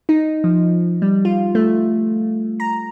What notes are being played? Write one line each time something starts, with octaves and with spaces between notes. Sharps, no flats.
D#4
F3
G3
F4
A3
A#5